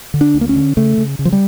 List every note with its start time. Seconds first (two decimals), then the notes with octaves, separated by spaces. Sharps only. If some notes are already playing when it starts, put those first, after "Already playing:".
0.14 D3
0.21 D4
0.34 D2
0.41 A#3
0.49 C#4
0.56 D3
0.77 C#3 A3
0.98 C#3
1.19 C#3
1.25 F3
1.32 G3